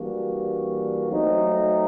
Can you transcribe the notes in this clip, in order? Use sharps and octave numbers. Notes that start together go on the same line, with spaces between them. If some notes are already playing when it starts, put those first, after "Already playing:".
Already playing: E3 G3 A#3 D4 F#4
F#3 A3 C4 D#4